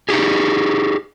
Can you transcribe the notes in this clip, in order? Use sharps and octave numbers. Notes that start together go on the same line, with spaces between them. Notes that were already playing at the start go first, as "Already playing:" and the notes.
D#4 G4 G#4